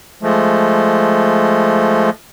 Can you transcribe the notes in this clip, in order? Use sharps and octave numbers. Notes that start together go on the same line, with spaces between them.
F3 G#3 A3